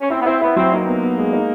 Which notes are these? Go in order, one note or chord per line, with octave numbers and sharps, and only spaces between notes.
C#4
C4 E4
B3
C4 E4
B3 E4
F#3 C4
A#3 D#4
B3
B3
G#3
D#4